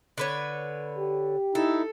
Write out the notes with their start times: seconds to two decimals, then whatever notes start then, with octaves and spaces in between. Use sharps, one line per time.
0.18 D3 B4 C#5
0.97 G4
1.55 D#4 E4 A4